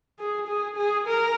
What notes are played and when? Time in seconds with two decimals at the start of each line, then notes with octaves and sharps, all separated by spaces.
0.19 G#4
0.48 G#4
0.77 G#4
1.07 A#4